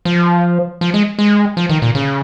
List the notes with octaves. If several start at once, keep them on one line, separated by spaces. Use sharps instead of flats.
F3
F3
G#3
G#3
F3
D#3
A#2
C#3